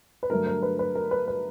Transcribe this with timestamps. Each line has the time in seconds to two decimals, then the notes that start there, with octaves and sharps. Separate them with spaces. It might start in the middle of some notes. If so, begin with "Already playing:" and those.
0.23 B4
0.30 G2 D3 F#3 A3 A#4
0.47 A#4
0.62 B4
0.79 B4
0.95 A#4
1.11 B4
1.28 B4